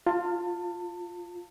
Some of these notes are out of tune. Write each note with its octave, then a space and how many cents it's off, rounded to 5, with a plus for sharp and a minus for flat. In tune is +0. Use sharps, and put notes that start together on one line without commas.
F4 +0 A5 +30